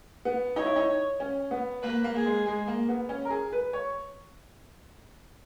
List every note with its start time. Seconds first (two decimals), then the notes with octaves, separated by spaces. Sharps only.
0.25 B3
0.56 D#4 C#5
0.66 E4
0.76 D#4
1.20 C#4
1.51 B3
1.83 A#3 B4
2.04 A#3
2.15 G#4
2.26 G#3
2.47 G#3
2.68 A#3
2.89 B3
3.09 C#4
3.25 A#4
3.30 G#4
3.53 B4
3.73 C#5